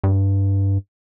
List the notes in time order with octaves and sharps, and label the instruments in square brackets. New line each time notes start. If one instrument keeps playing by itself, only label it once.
[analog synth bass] G2